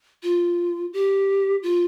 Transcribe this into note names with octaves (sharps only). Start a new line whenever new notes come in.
F4
G4
F4